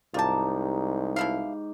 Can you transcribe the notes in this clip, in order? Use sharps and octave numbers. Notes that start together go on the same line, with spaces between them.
C2 G#2 D#4 F4 G4 A5
B2 E4 F5